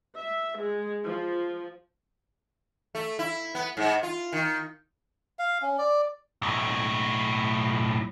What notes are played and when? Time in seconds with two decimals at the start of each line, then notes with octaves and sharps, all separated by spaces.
0.15 E5
0.58 G#3
1.05 F3
2.95 A3
3.19 E4
3.55 B3
3.77 G#2
4.03 F4
4.33 D#3
5.39 F5
5.62 C#4
5.78 D5
6.42 B1 A2